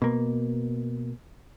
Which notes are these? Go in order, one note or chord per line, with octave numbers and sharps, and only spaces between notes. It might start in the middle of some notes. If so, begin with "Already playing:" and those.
B2 A#3